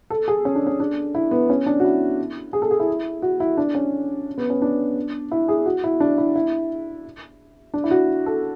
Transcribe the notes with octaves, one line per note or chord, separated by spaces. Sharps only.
A4
G#4
C#4
D4
C#4
D4
E4
B3
C#4
D4
F#4
E4
G#4
A4
G#4
E4
F#4
E4
D4
C#4
B3
C#4
D4
E4
G#4
F#4
E4
D4
E4
E4
D4
E4
F#4
A4